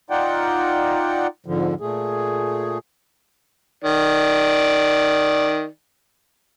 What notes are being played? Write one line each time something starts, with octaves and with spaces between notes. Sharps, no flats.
D#4 F4 D5 F#5 G5
F2 G#2 D3 F3
A#2 A3 G#4
D#3 D5